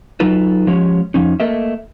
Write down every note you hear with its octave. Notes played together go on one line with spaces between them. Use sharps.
F#3 D#4 F4 A4 B4
F3 G#3 C#4 G4 C#5
F2 F3 C#4 D#4
A3 A#3 A4 A#4 D#5 E5